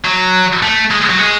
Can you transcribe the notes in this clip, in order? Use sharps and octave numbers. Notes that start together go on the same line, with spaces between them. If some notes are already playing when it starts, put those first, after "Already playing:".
F#3
A3
G#3
F#3
G#3